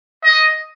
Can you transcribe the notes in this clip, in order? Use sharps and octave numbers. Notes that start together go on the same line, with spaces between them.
D#5